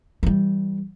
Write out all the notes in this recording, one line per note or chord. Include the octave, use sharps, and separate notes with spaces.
E3 G3